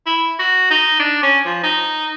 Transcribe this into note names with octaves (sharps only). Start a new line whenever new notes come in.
E4
F#4
D#4
D4
C#4
F3
D#4